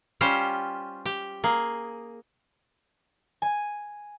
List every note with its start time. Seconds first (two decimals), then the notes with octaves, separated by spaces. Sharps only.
0.21 G3 C#4 F4 G4 C5
1.06 G4
1.44 A#3 G#4
3.42 G#5